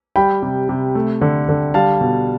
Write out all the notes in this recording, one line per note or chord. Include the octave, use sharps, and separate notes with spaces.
G3 G5 B5
C3
C3
A3
D3
D3
G3 F5 A5
B2